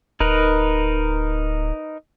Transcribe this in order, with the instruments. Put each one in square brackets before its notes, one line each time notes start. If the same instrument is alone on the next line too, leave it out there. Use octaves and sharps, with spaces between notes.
[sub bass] D1 [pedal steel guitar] D#4 A#4 B4